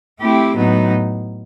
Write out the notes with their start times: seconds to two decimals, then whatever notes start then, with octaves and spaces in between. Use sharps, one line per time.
0.20 A3 C4 E4 G4
0.56 A2 F#3 B3 D#4